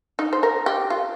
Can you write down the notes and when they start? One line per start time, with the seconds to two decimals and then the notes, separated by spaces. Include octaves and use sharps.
0.19 D#4
0.33 C5
0.43 A#4
0.66 G4
0.90 F4